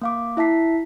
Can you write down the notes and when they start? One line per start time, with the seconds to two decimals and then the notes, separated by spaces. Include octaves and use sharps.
0.02 A#3 F5 D6
0.37 E4 E5 A5 B6 C7